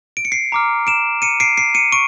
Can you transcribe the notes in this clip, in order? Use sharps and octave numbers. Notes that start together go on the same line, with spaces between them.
D7
C#7
C7 D7
A#5 D6 F6
D7 E7
C#7 D#7
C7 D7
C7 D7
C#7 D#7
C#6 D7